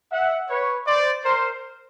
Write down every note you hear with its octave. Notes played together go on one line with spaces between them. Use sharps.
E5 F#5
B4 C#5
C5 D5
A#4 C5